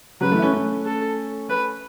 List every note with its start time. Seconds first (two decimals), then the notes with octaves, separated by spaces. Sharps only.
0.21 C#3 F#3 B4
0.32 E3 A3
0.38 E4
0.42 A3 C#4
0.52 A3 C#4
0.86 A4
1.49 B4